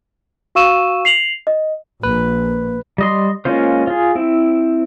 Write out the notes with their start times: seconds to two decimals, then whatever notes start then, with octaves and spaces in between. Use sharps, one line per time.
0.55 F#4 F5 C#6 E6 D#7 E7
1.05 C7 F7 F#7
1.47 D#5
2.03 A#1 A#3 B4
2.98 G3 D#5 C6
3.45 G#3 A#3 C#4 F4 C5
3.87 F4 G#4
4.15 C4 E4